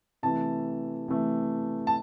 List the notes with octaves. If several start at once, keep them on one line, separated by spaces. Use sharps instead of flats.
C3 E3 A3 A5
C3 E3 A3
A5